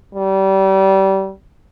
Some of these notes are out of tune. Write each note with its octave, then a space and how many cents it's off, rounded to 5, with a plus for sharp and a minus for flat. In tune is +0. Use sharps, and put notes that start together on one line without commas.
G3 -25